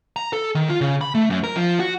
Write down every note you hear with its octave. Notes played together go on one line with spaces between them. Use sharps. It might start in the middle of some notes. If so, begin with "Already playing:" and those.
A#5
A4
D#3
F4
C#3
B5
A3
F#2
A#4
F3
F#4